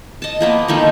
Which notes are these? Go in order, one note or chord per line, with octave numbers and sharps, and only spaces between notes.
D#5 A5
F3 A#3 B3
D#3 F3 A3 D#4